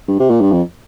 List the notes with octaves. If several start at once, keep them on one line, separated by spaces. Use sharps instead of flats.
G2
C3
A#2
G2
F2